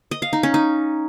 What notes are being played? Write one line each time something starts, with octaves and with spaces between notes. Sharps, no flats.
D#5
F5
D#4
C#4
D#4